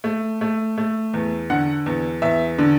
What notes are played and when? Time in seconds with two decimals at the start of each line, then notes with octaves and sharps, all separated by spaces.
0.04 A3
0.41 A3
0.78 A3
1.14 E2
1.50 D3 F#5
1.86 E2
2.22 E2 E5
2.59 D3